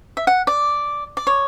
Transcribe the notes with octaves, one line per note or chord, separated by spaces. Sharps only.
E5
F#5
D5
D5
C#5